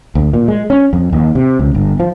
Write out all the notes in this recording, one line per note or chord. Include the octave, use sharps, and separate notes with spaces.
D2
A#2
G#3
C#4
F2
D#2
C3
C#2
G1
F3